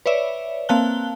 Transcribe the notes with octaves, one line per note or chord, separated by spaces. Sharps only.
B4 C#5 D5 E5
A#3 C4 F5 A5 F#6 G7